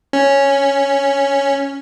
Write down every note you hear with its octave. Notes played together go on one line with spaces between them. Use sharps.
C#4